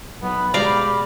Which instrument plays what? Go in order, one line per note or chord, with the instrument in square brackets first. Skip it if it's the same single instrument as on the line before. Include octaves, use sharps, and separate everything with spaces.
[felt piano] B1 [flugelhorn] B3 [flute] B5
[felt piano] B2 G#3 [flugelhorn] G4 [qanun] D5 F5 A#5